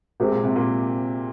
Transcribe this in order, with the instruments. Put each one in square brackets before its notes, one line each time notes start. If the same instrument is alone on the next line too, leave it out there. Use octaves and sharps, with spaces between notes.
[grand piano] C3 [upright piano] G#3 C4 G4 A#4
[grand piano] A#2
C3
A#2